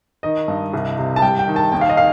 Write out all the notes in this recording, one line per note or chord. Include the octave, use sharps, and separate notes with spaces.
D#3 D#5
G2
C2
C3
A5
G3 G5
G5
D#3
A5
D#2 G5
F5
D#5
F5